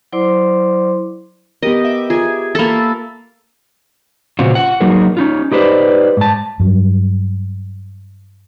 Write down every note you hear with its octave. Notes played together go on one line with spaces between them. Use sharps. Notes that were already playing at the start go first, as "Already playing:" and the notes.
F#3 E4 C5 D5 C6 D6
B3 G4 A#4 D#5
E5 D6
F4 G#4 G#6
A#3 A4 B5 E6 A6
A#2 C#3 C4 F4 F#4
F4 F#5
F#3 A#3 D#4 F#4 G#4 A#4
C#4 D#4 F4
D#4 G4 B4 C5 D5
G#2 A5
G2 F#3